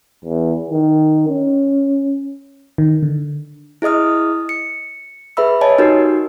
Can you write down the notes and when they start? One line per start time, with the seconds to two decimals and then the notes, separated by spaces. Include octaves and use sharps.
0.25 E2
0.71 D#3
1.28 C#4
2.78 D#3
3.03 D3
3.82 E4 G#4 D#5 D#6 F6
4.49 C#7
5.37 G#4 B4 E5 B5 E6
5.61 C#5 D#5 G#5 A5
5.78 D#4 F#4 G4 A#4